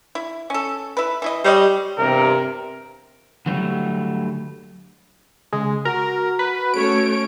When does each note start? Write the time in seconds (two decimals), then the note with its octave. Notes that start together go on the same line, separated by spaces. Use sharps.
0.15 E4
0.50 C#4 A4
0.97 E4 B4
1.22 E3 E4 D#5
1.44 G3 C5 C#5 D#5
1.98 E2 G2 C3 A#4
3.46 D3 F#3 G3 A3
5.53 C#3 G#3
5.85 F#4 A#4
6.39 B4
6.74 A3 C#4 C#5 D7